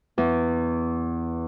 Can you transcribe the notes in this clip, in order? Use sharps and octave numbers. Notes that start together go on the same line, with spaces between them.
E2